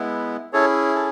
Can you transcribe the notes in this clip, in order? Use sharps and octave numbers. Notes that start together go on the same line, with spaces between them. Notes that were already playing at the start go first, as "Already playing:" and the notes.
Already playing: G#3 B3 E4
C#4 E4 G#4 A4 C#5
A4